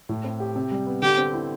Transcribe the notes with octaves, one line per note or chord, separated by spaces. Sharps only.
A2
C4
G4
C3
G3
B3
D3 G4
C4
E4